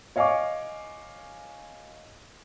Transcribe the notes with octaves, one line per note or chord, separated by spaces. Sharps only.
C#5 D#5 F5 G#5 C#6 D6